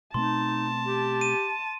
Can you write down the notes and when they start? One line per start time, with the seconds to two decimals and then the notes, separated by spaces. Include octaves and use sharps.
0.14 B2 A3 C4 D#4 A5 C6
0.86 G4
1.21 D#7